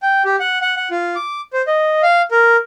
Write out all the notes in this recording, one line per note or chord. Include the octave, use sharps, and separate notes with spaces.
G5
G4
F#5
F#5
F#5
F4
D6
C5
D#5
F5
A#4